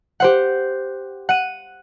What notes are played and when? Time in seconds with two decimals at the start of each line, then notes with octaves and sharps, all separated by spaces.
0.20 G4 C5 F#5
1.29 F#5 D#7